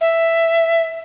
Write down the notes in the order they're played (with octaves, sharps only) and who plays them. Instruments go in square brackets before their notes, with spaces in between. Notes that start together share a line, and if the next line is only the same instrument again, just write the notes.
[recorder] E5